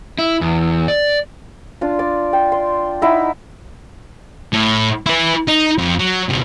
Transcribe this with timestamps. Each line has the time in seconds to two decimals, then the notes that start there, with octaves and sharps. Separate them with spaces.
0.19 E4
0.41 E2
0.88 D5
1.81 D4 F4
1.99 D5
2.33 G5
2.52 C6
3.02 D#4 E4 F#5 A#5
4.53 A2
5.06 E4 B4
5.47 D#4
5.78 F2
5.99 F#3
6.29 C#2 B2